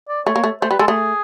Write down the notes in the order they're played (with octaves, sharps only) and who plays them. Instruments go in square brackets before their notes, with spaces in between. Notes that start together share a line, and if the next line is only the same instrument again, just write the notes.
[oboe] D5
[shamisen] A3 [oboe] C#5
[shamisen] A#3
A3
[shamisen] A3 [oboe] C5
[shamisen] G3 [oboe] B4
[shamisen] G#3 [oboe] A4
[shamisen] A3 [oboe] G#4